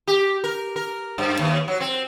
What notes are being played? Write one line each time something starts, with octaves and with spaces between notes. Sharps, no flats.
G4
A#4
A#4
G2
D#2
F#3
C4